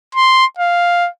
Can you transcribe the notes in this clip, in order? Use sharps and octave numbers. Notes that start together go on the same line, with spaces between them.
C6
F5